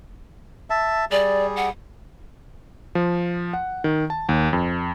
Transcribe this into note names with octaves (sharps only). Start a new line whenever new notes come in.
E5 A5
G3 G#4 D5
F#5
F3
F#5
D#3
A5
D#2
F2